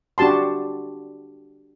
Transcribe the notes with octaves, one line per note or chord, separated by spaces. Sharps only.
D4 F#4 G4 A5 C6